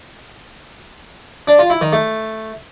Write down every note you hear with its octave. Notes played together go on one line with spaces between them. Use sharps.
D4
F4
E4
D#3
A3